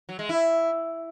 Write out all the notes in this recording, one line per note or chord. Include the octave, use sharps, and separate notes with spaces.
F#3
G#3
E4